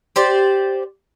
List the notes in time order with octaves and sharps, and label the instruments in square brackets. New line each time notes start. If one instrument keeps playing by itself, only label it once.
[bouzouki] G4 C5 D5